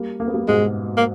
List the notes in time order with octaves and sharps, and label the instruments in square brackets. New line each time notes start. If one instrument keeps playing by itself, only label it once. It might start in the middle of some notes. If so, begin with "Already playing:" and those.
Already playing: [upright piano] G3 A#3
A#3
B3
G3 A#3
[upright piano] G#2 B2 [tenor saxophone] G#3
[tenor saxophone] A#3